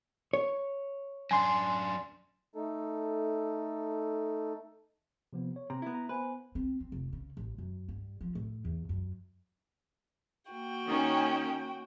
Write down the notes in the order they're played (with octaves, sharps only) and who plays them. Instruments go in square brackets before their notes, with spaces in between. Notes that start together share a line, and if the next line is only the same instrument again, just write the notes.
[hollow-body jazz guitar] C#5
[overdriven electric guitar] F#2 D4 [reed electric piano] G#5 C6
[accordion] A3 D#4 A4
[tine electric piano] C3 F3 B3
C#5
[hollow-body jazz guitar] C3 [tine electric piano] A#5
[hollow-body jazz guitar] B3 E4
[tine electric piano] A#5
[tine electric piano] B3 C5 G#5 [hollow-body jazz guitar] B4
[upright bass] C4
C4
F1
C#3
A1
F#2
G2
F3
A2
E2
F#2
[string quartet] A#3 F#4 G5
[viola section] D#3 C#4